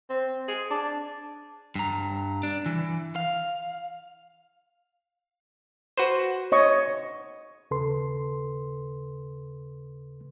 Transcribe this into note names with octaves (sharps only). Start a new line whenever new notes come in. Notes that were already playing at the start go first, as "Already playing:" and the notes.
C4
G#4
D4
G2 A#5
D4
E3
F5
F#4 B4 C5
C#5 D#5 C#6
D#2 C#3 A4 B4 C6